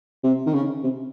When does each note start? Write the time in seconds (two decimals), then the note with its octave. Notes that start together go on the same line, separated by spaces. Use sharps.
0.24 C3
0.47 D#3
0.54 C#3
0.83 C3